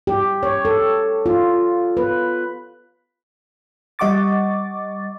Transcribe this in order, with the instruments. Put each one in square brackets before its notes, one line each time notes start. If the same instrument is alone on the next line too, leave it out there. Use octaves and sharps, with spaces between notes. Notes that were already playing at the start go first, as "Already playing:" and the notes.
[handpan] G4
C#5
A4
F4
B4
[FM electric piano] G3 D#5 F#5 C#6 D6 A6